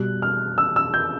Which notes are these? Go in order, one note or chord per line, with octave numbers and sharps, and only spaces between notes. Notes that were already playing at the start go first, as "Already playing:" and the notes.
Already playing: B2 G3 F#6
F6
E6
E6
G6